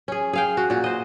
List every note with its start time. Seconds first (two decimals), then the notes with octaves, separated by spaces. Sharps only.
0.08 C#4 G#4
0.33 G#4 F5 G5
0.57 F#4
0.70 A#2 F#4
0.84 C5 D#5